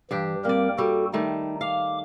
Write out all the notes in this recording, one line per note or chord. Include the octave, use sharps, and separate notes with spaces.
G2 E3 D4 G4
G3 A#3 C4 A#4 D5
G3 F#4 A4
D#3 G3 A3 D#4
F5 D6